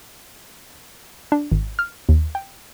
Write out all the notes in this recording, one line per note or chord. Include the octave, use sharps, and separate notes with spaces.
D4
G#1
F6
D#2
G5